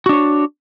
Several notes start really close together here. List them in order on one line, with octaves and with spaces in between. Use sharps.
F#4 D4 C#5